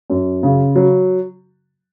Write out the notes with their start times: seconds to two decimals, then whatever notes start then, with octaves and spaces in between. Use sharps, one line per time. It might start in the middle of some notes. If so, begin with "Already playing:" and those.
0.10 F#2
0.43 C#3
0.75 F#3